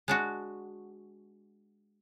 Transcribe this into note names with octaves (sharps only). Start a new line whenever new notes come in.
G#3 D4 F#4